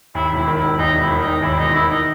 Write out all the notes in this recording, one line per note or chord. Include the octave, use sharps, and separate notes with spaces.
D#2 E4
E1 E4
D#3
E1 E4
D#2 D#4
E1
E4
D#3
D#4
E1
D#2 E4
E1 D#4
D#3 E4
D#4